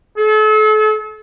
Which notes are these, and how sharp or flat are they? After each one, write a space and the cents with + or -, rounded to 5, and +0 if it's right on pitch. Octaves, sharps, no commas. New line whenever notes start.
A4 -40